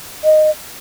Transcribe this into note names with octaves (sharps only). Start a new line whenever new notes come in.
D#5